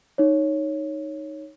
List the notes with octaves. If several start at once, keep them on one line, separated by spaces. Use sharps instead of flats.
D#4 C#5